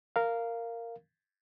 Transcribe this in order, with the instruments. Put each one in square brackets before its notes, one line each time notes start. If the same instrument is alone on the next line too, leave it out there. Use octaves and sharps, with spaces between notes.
[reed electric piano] A#4 F5